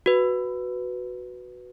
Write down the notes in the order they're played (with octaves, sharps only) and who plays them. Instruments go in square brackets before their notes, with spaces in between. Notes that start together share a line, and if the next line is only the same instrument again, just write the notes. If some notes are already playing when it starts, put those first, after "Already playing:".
[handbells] F#4 B4